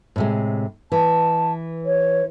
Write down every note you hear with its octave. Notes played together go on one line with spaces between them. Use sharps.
A2 C3 G#3
E3 A5
C#5